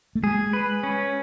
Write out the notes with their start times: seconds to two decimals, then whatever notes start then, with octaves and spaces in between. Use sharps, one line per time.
0.15 A3
0.23 G#3 G#4
0.53 B4
0.83 C#4